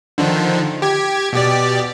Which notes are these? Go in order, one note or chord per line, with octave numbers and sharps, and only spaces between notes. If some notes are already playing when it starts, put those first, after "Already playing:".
D3 D#3 F3
G4 G#6
B2 G4 D5